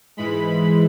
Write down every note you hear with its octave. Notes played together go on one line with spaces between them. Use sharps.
G#2 E3 G#3 B5
B5